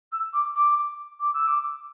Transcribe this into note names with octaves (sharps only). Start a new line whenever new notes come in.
E6
D6
D6
D6
E6
D6